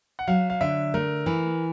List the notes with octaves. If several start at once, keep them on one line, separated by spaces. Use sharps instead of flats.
F#5
F#3 F5
F5
D3 E5
A3 A#4
E3